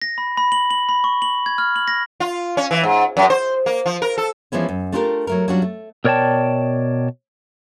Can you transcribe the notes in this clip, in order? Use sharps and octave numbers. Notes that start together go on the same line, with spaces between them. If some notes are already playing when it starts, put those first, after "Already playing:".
A#6
B5
B5
F#7
F#7
B5
C#6
F#7
G#6
F6
F#7
A#6
F4
C#4
E3
G#2
F#2
C5
A#3
F3
A#4
A4
E3 F3 G#3 B3 C#4
F#2
A3 D4 F4 G4 G#4 A#4
F#3 A3 A#4
F#3 G3 C#4 D4 F4 F#4
A3
B2 A#4 C#5 D5 G5 A5